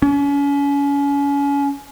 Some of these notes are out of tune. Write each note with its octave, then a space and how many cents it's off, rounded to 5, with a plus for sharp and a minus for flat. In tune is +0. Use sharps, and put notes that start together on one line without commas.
C#4 +35